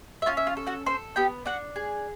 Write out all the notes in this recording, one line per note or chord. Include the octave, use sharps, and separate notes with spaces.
E5
C#4 F4 F5
E5
F4 F5
A4
F#4 F#5
A4 C5 C6
B3 G4 G5
D4 F#4 F#5
G#4